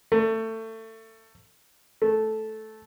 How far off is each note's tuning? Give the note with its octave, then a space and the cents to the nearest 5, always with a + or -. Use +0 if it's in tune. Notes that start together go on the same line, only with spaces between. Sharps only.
A3 +25
A3 -10